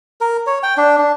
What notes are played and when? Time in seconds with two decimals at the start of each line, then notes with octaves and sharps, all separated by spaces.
0.21 A#4
0.47 C#5
0.63 G5
0.77 D4
0.98 D4